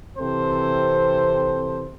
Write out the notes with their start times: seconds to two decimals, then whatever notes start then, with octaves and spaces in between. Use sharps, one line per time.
0.17 C3 E3 C4 A4 C5